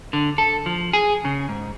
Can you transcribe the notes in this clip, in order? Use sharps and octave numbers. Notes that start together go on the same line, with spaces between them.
D3
A4
F3
G#4
C#3
G#2